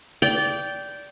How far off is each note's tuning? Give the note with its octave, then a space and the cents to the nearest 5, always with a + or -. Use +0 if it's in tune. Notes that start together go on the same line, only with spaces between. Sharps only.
D5 -20 G5 -10